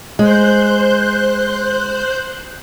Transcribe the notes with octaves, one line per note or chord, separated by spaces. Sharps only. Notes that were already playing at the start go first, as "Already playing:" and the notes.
G#3 C5 F#6 G6